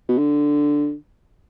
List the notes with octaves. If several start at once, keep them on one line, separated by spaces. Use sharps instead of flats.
B2
D3